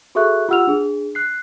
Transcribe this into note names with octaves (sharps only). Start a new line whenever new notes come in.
F#4 G#4 A4 E5 C#6 F#6
F4 G4 F#5 E6 F6 F7
D4 G#4
F#6 C7